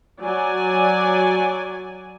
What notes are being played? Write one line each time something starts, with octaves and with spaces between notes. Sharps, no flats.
F#3 D5 G#5